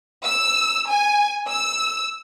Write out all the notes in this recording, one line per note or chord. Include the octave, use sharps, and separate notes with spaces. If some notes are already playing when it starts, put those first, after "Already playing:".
E6
G#5
E6